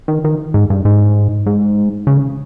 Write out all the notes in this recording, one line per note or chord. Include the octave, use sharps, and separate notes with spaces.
D#3
D#3
G#2
G2
G#2
G#2
C#3